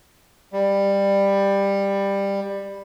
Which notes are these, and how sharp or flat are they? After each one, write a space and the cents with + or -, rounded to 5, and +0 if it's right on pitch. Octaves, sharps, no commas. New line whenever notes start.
G3 +15